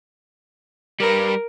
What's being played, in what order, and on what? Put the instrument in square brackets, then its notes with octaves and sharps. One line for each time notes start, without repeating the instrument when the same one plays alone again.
[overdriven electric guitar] G3 B4 [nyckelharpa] A#4